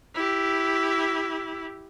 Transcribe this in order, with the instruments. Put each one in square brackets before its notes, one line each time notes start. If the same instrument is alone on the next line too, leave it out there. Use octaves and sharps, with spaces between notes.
[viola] E4 G4